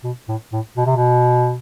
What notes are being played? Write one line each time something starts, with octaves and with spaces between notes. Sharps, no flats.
B2
A2
A2
B2
C3
B2